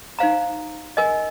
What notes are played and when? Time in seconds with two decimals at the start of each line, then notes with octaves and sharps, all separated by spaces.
0.19 D#4 C5 F5 A#5
0.97 A#4 D#5 G#5